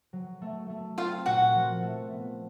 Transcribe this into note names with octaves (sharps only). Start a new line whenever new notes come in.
F#3
A3
A3
C4 F4 F5
A#2 F#4 F#5
F3
A3
B3